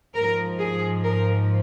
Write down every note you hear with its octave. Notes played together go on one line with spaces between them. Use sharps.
G#2 F3 A#4
G#4
A#4